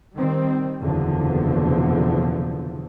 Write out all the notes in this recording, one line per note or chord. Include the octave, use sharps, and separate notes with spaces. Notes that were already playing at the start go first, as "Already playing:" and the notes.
D#3 G3 C4
F#1 E2 B2 D3 F3